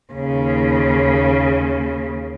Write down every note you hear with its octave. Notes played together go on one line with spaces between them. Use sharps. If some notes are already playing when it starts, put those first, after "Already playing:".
D#2 C#3